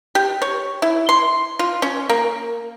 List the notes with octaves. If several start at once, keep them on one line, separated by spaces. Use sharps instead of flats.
G4
C#5
E4
C6
F4
C#4
A#3